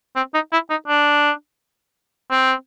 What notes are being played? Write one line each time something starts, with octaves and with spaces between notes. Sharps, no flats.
C4
D#4
E4
D#4
D4
C4